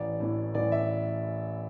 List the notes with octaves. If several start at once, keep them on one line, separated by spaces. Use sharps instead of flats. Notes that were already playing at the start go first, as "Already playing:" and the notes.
Already playing: A1 D5
A2 E3
A1 D5
E5